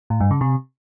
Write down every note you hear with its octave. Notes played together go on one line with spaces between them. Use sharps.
A2
G2
C#3
C3